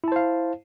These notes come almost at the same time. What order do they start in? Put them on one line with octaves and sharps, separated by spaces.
E4 A5 C5 F5